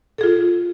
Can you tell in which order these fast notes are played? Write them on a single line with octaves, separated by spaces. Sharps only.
A4 G#4 F4